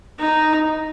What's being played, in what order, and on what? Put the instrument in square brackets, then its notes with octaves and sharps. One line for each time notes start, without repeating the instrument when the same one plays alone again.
[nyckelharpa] D#4